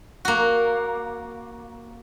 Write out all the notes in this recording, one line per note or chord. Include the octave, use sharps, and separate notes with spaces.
A#3 F#4